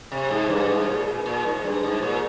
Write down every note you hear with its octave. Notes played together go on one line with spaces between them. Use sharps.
C3
G#2
G2
G#2
A#2
A#2
A#2
G#2
G2
G#2
A#2